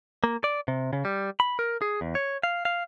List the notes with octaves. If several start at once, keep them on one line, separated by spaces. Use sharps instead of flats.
A#3
D5
C3
C#3
G3
B5
A#4
G#4
E2
C#5
F5
F5